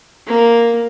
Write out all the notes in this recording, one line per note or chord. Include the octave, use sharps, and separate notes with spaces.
A#3